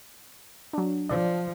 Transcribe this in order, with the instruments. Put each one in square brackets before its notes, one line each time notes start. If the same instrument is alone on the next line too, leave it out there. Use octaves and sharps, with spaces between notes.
[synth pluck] F#3 D4
[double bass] F3 [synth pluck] D5